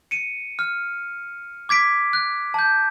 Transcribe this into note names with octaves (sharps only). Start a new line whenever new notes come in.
C#7 D#7
F6
D6 G#6 B6 D7
F#6
A5 G6